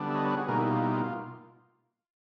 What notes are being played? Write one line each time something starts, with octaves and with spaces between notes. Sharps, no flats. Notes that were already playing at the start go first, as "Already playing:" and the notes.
Already playing: D3 G3 B3 D4
E5
C#5 D#5
B4 C#5
F#4 G#4
B2 G3 A#3 D#4 G#4 A#4
E4
F4
E4
F4
F4